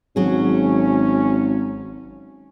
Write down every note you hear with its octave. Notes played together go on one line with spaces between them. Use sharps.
G#1 F#3 C#4 G#4